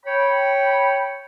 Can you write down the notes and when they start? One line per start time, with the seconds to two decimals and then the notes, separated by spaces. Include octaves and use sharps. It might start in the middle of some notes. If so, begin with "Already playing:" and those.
0.05 C#5 G5 B5